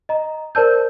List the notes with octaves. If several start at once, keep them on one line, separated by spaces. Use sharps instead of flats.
D#5 A#5
A#4 C5 D5 A5 E6 G6